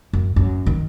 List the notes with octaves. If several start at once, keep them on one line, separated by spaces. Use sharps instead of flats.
F#2
F#2
D#3